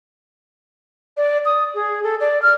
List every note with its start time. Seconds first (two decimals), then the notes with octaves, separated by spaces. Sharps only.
1.17 D5
1.45 D#6
1.75 G#4
2.04 A4
2.20 D5
2.42 F6